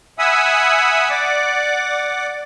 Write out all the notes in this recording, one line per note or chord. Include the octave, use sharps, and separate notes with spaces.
E5 F#5 G#5 B5 D#6 E6
D5 F#5 D6